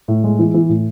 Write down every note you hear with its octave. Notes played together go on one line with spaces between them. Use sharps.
A2
G#3
E3
E3
A2